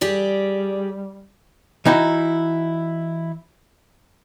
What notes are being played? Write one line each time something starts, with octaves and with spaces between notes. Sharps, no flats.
G3 G4 G#4 D5
E3 D#4 E4 F#4